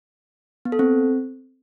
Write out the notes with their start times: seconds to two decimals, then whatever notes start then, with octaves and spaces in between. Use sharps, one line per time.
0.65 B3
0.72 A4
0.79 C4